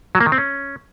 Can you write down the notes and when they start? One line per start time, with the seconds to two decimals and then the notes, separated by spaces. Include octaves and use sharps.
0.15 F#3
0.21 A#3
0.26 D#3
0.32 C4
0.38 C#4